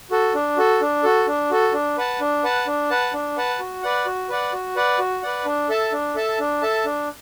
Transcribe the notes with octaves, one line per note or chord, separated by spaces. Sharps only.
F#4 A4
D4
F#4 A4
D4
F#4 A4
D4
F#4 A4
D4
B4 F#5 A5
D4
B4 F#5 A5
D4
B4 F#5 A5
D4
B4 F#5 A5
F#4
B4 D5 F#5
F#4
B4 D5 F#5
F#4
B4 D5 F#5
F#4
B4 D5 F#5
D4
A4 E5 A5
D4
A4 E5 A5
D4
A4 E5 A5
D4